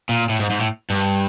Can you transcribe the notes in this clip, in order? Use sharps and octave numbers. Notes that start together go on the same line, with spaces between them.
A#2
A2
G#2
G#2
A2
G2